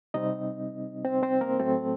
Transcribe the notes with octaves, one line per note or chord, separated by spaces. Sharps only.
C3 G3 C4 D#4 D#5
C4 C5
C4 C5
A#3 A#4
A2 F#3 A3 C4 A4